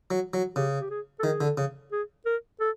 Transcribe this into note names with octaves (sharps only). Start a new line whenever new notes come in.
F#3
F#3
C#3 G4
G4
G#4
A4
D#3 G#4
D3
C#3
G#4
A#4
A4